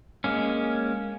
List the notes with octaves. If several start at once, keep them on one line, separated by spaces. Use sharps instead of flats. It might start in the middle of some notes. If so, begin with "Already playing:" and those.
G#3 A#3 C#4